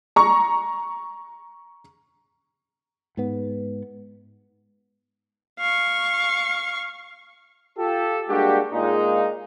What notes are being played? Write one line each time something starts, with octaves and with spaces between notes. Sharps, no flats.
A#5 C#6
G#2 B3
F5 C#6
F4 G4 A4
G3 G#3 A#3 D4 F#4 G4
A#2 G#3 D#4